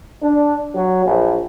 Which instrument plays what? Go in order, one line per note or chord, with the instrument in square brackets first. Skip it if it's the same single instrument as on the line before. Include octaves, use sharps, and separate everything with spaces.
[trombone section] D4
F#3
A#1